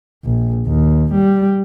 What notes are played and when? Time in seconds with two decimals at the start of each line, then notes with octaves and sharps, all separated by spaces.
0.25 A#1
0.67 D#2
1.14 G3